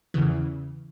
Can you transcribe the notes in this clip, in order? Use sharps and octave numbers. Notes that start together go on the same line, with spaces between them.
E2 C#3 E3